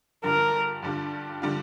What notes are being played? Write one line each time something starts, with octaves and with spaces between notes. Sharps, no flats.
G2 D3 G3 D4 F4 A#4
G2 D3 G3 D4 F4
D3 G3 D4 F4